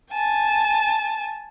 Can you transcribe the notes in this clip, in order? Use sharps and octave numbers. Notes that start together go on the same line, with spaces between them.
G#5 A5